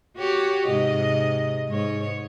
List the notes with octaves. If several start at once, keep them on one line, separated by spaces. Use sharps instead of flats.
F#4 G4 C#5
G#2 C3 D#5
G#2 C#5